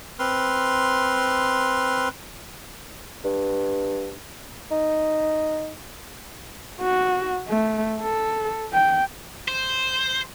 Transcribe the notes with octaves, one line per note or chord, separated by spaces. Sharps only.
C4 B4 C6 F6
G2
D#4
F#4
A3
A4
G5
C5